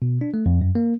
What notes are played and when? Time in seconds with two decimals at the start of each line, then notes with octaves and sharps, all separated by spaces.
0.02 B2
0.21 D4
0.34 A3
0.46 F2
0.61 F#2
0.75 A#3